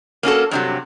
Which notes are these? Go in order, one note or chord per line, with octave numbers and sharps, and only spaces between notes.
A#3 C#4 F#4 A4
G2 C3 F#3